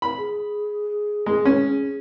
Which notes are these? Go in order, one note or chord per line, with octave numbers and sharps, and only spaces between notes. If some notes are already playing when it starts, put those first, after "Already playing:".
B5
G#4
G#3
C#4